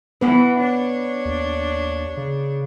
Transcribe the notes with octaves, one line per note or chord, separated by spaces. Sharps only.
E3 B3 B4
D4 C#5
D#2
C#3